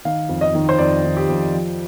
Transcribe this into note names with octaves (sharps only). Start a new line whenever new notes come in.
D#3 F5
F2
D#5
D#3
C5
F2 D5
D#3
G4
F2
F3